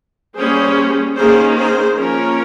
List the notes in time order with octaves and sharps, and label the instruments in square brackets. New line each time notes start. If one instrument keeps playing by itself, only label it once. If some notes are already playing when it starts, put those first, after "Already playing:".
[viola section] G3 A#3 C#4 G#4 C5
D#3 A#3 C#4 G#4 C5
G#4 C5
F3 A#3 C#4 A#4 C#5